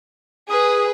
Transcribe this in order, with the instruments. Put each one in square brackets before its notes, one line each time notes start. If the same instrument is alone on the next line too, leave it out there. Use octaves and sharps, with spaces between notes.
[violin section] G#4 [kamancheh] B4 [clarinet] D#6